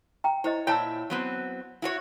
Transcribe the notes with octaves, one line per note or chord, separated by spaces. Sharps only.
G5 A#5
E4 C5 C#5 D#5
A#2 E4 C#5 G5 A5 E6
F#3 B3 C4
E4 F#4 C#5